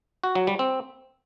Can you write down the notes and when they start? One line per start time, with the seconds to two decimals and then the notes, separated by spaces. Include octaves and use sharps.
0.24 F#4
0.35 F#3
0.47 G3
0.59 C4